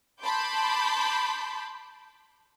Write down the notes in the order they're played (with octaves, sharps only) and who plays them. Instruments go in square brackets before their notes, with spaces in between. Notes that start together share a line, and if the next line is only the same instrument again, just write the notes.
[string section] A5 B5 C6 D6 G6